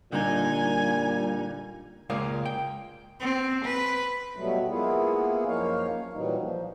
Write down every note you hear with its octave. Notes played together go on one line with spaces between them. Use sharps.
A#2 D3 G3 D#4 G#5
C#2 G#3 A#3 F4 D5 F5
G5
C4
B4
B2 F#3 G3 A3 B3
G#3 A#3 B3 E4 F4 G#4
F#2 F3 A#3 D#4 C#5 F5
A#2 E3 F#3 G3 D#4
F3